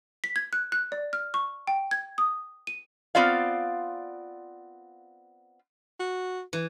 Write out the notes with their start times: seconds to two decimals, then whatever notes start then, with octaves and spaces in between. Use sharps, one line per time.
0.24 B6
0.36 G#6
0.53 F#6
0.72 F#6
0.92 D5
1.13 F6
1.34 C#6
1.67 G5
1.91 G#6
2.18 D#6
2.67 D#7
3.15 B3 C4 F4 D5 F5
6.00 F#4
6.53 E3